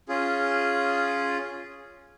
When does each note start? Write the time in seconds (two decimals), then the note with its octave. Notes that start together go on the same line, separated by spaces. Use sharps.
0.09 C#4 F4 G#4